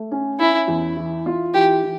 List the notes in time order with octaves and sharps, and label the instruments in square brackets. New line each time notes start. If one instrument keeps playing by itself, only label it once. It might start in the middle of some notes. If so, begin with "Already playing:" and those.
Already playing: [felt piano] A3
C#4
[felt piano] C#4 [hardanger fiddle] E4
[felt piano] E2
E3
F4
[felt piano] E3 [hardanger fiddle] G4
[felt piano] E3